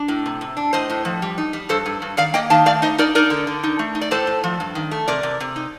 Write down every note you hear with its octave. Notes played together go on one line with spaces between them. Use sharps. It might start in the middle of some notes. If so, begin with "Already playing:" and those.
Already playing: D4
A2
C3
C3
D4
A2 C5 D#5
A2
F3
G3
D#4
G3
G2 A4 C5
G2
G2
D#3 D5 F5
A#3 D#5 G5
D#3 F5 A5
A3 D5 F5
D#4 C5 D#5
D#4 A#4 D5
D#4 A#4 D5
D3
D3
D#4
A3
D#4
D5
A2 A4 C5
A2
F3
G2
D#3
A3
C3 A#4 D5
C3
C3
D#4